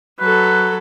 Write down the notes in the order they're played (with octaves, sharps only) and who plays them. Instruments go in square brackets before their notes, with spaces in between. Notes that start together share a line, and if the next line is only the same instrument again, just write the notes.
[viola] F#3 A4 [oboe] B4